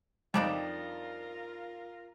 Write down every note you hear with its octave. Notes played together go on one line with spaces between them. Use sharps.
F2 G3 D4 D#4 F4 A#4